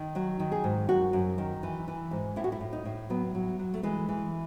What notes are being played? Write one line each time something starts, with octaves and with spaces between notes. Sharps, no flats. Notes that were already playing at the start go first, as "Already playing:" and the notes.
Already playing: D#3
F#3 F#4
D#3
G#4
G#2
F#2 F#4
F#2
D#3
E3
E3
G#2
A2 E4
F#4
E4
A2
D#4
A2
F#3 B3
F#3
F#3
A3
E3 G#3
E3